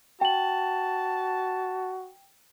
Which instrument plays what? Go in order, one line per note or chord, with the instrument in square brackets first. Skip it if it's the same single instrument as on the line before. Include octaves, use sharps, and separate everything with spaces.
[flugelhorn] F#4 [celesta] G5 F#7 [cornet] A5